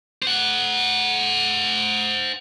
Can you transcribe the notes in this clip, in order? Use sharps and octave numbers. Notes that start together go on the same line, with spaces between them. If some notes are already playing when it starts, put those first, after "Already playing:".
C5 F#5